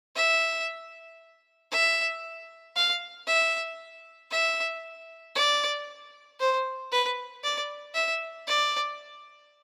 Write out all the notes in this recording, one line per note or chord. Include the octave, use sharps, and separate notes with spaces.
E5
E5
F5
E5
E5
D5
C5
B4
D5
E5
D5